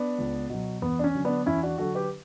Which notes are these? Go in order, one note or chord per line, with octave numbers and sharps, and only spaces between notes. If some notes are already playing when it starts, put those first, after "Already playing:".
Already playing: B3 D4
C#2
B2 F#3
E2 B3
D4
C#4
D3 F#3
B3 D4
E2 C#4 E4
D4 F#4
D3 F#3 F#4 A4
G4 B4